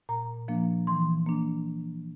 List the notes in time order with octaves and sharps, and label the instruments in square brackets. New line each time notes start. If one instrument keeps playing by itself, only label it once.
[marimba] A#2 A#5
F3 A#3 D4
E3 C6
A#3 D4